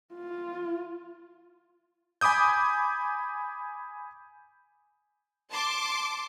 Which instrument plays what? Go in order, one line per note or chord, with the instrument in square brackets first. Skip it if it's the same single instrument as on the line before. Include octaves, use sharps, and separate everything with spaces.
[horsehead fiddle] F4
[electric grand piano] G#5 B5 D6 D#6 G6
[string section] A5 C6 D6